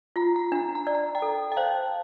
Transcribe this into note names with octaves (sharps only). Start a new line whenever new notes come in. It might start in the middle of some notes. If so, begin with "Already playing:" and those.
F4 A#5
A#5
D4 A#5
A#5
D5
A#5
G5 A#5
A4
G5
C5 F5 A5